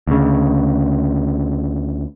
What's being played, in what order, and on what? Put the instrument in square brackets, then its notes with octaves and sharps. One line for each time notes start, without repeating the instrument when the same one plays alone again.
[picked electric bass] D2 C#3